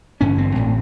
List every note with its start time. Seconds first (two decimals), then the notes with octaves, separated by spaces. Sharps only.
0.20 A1 G2 D3 C#4
0.38 C4
0.55 A1 A2